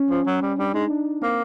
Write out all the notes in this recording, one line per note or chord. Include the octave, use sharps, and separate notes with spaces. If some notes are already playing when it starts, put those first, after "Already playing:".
Already playing: C#4
F3
F#3
G3
G3 D4
G#3 D#4
D4
A#3 C4